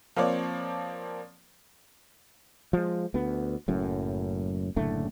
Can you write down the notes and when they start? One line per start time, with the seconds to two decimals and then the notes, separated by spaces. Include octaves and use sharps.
0.16 F3 A#3 C4 C#5 D5
2.73 F3 G#3
3.14 D2 B3
3.68 F#1 F#2 A2
4.76 F#1 A2 D3 A3